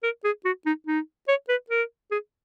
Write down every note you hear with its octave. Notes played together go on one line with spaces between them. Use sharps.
A#4
G#4
F#4
D#4
D#4
C#5
B4
A#4
G#4